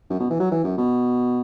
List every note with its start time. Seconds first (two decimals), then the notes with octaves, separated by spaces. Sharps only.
0.10 F#2
0.19 B2
0.30 E3
0.40 F#3
0.51 E3
0.64 F#2
0.78 B2